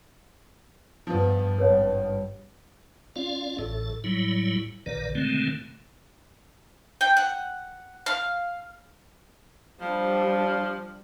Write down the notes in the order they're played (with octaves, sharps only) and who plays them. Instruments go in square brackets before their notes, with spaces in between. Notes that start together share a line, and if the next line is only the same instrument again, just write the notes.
[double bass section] G2 [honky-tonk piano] F3 B3
[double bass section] G#1 G2 [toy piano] B4 C#5 F#5
[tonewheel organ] C#4 F4 D5 F5
A1 A2 A4
A2 F#3 G3 E4
A#1 A#2 D#3 B4 D5
B2 D3 D#3 G#3 A3 C4
[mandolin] G5
F#5
F5
[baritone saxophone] F3 [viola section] G3 D4 [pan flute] C5